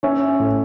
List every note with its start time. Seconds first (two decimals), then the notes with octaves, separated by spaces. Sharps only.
0.03 C#4 C#5 E5
0.39 A2